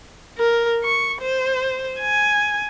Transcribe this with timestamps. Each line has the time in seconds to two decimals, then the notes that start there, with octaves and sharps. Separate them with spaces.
0.38 A#4
0.84 C#6
1.22 C5
2.00 G#5